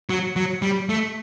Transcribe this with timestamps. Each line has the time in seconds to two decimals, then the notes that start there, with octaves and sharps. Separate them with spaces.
0.10 F#3
0.36 F#3
0.62 G3
0.89 A3